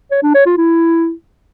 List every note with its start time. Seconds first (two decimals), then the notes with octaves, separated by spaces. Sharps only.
0.11 C#5
0.23 D4
0.34 C#5
0.46 F4
0.57 E4